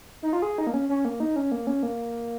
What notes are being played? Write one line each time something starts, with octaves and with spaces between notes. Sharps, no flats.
D#4
F4
G#4
D#4
A#3
C#4
C#4
A#3
D#4
C#4
A#3
C#4
A#3